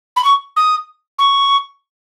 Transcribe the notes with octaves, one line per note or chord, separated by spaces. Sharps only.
B5
C#6
D#6
C#6